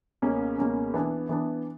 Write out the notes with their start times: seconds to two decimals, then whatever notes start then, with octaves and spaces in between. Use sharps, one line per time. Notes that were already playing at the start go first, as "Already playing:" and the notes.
0.22 C#2 B2 A#3 C#4
0.58 C#2 B2 A#3 C#4
0.94 E3 B3 D4
1.29 E3 B3 D4